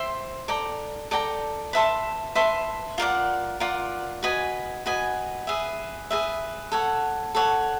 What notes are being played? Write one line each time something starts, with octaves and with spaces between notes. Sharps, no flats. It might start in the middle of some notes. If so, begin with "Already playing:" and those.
Already playing: C5 E5 G5 C6
A4 D5 G5 A#5
A4 D5 G5 A#5
B4 E5 A5 C6
B4 E5 A5 C6
F4 A#4 D5 F#5
F4 A#4 D5 F#5
F#4 B4 D#5 G#5
F#4 B4 D#5 G#5
G#4 B4 E5
G#4 B4 E5
A4 C#5 F#5
A4 C#5 F#5